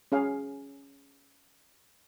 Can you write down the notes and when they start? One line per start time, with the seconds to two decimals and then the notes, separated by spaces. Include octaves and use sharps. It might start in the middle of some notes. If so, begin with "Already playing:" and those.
0.12 C#4 G#4 F5